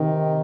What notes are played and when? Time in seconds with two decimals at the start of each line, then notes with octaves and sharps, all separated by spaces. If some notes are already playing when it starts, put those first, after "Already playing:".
Already playing: C3 D#3